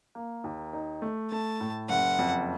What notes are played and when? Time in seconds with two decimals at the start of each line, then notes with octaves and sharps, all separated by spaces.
0.15 A#3
0.44 D#2
0.73 D#4
1.02 A3
1.31 A3 A5
1.60 A2
1.89 F#1 F#5
2.19 F2